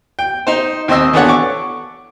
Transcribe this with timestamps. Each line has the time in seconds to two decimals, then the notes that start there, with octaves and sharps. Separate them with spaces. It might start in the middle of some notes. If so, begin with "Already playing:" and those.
0.19 G5
0.47 D#4 C5
0.88 D#2 C4 C5 D#5 E6
1.13 E3 B3 D4 A4 C#5 F#5
1.28 C#6 D6